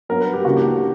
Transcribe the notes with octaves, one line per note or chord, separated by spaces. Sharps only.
G2 F#3 B3 A#4
B4
G4
C#2 C#3 E3 A#3 D4 F#4
G4